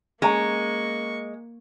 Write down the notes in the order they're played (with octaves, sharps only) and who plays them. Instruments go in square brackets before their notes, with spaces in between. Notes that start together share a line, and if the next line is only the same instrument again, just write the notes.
[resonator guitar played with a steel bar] G#3 [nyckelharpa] A#3 C#6 [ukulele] C#4 A#5